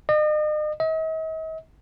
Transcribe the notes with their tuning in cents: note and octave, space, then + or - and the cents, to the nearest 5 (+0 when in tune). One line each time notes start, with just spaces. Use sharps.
D#5 -40
D#5 +45